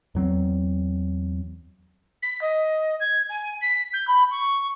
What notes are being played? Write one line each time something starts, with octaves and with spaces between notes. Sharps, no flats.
E2 F#3 C4
B6
D#5
G#6
G#5
B6
G6
B5
C#6